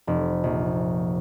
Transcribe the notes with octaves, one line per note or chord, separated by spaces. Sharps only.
F1
A#1